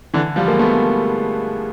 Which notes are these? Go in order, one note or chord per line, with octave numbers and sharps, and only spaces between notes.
D3 E3
F3 G3
G#3 A#3
A3 B3